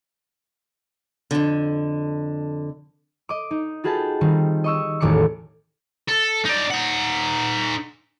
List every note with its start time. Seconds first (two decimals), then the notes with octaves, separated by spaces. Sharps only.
1.31 F2 D3
3.29 D#5 D6
3.51 D#4
3.84 F4 F#4 G#4 B4 G5 A5
4.21 D#3 G3 C4 D#4
4.64 D#5 C#6 E6
5.00 A1 E2 D#3 D6 C#7
6.09 A4
6.45 D#4 D5
6.70 D#4 F#5